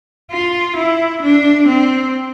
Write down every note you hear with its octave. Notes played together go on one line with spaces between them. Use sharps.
F4
E4
D4
C4